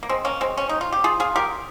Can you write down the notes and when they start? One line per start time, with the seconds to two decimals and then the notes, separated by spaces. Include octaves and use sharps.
0.03 A#3
0.09 G#3 C4
0.25 A#3 C#4
0.41 G#3 C4
0.57 C#4
0.69 D#4
0.81 F4
0.92 G4
1.04 F4 G#4
1.20 F4 G#4
1.36 G4 A#4